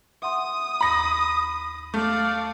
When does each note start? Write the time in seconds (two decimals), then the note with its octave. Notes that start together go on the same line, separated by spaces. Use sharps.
0.22 E5 F#5 C6 D#6
0.81 D#2 B5 A#6
1.94 A3 D5 F5